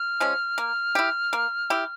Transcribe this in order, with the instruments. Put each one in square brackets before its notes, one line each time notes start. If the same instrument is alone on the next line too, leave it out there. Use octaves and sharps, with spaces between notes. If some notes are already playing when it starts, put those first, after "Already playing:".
Already playing: [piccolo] F6
[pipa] F3 G#3 C#4
A#3
E4 G4
A#3
E4 G4